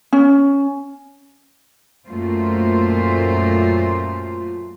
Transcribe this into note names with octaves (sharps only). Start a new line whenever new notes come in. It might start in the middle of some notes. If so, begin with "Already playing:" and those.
C#4
F#2 A#2 A3 A#3 F4 C5